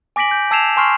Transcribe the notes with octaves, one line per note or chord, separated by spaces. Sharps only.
G#5 D6 A#6 B6 D7 F#7
G6
A5 E6 G#6 C7 E7 F7
G#5 C6 C#6 F6 C7